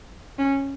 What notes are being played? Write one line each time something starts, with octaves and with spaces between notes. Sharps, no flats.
C#4